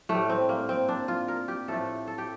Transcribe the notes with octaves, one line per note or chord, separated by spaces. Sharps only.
A2 G3 A3
C4
A#3
C4
D4
F4
A#4
G4
A2 F3 A3 A4
A4
G4